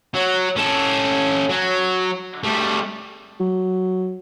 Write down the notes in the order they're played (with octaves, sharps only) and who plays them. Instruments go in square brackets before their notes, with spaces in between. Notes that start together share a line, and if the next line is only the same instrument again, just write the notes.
[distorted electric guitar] F#3
C#4 A4
F#3
G3 A3
[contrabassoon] F#3